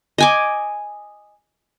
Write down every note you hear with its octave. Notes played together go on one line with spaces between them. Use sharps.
D#5 G#5 D6